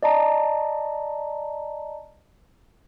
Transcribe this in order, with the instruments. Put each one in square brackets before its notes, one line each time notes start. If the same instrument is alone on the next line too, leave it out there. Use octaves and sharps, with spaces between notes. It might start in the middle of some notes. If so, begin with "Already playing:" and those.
[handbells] D5 D#5 A5 A#5